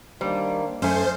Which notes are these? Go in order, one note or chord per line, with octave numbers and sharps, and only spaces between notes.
D#3 G3 A#3 D4 C5
F#2 A3 C#4 C5 D#5 G#5